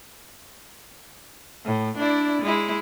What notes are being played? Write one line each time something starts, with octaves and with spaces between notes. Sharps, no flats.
A2
D4 E4 D5
G#3 E4